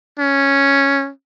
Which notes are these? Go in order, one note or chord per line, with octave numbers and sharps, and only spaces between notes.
C#4